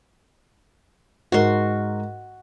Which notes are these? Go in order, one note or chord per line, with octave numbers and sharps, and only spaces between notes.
G#2 F#4 A#4 C6